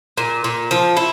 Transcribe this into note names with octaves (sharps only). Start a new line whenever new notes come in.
A#2
A#2
F3
E4